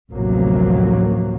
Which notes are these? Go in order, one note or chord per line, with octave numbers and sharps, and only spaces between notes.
A1 D2 C3 F3 F#3 A#3